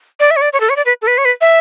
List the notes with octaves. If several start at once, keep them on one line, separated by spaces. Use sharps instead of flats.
D5
E5
C#5
D5
C#5
A4
C#5
D5
B4
A4
B4
C#5
B4
E5